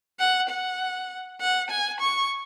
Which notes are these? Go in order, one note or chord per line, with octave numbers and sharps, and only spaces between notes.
F#5
F#5
F#5
G#5
C#6